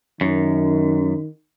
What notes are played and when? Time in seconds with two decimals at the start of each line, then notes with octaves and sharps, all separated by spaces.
0.21 F#2 D#3